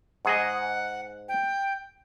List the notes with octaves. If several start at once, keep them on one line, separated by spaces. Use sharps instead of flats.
G#2 G#4 D#5 F#5
G5